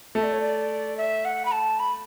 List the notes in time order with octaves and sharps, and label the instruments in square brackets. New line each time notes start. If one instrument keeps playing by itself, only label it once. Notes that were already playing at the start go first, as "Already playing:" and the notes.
[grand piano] A3 [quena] E5
[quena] D5
C#5
D5
E5
F#5
B5
A5
B5